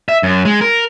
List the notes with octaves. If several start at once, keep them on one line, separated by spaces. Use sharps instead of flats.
E5
F#2
G#3
A#4